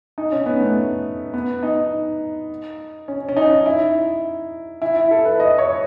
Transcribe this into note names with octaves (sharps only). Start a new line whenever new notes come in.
D#4
C#4
B3
A3
B3
D#4
C#4
C#4
D#4
E4
E4
E4
A4
B4
D#5
C#5